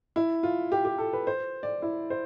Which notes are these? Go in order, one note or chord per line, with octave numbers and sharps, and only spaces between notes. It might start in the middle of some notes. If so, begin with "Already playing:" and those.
E4
F4
G4
G4
A4
B4
C5
D5
E4
C5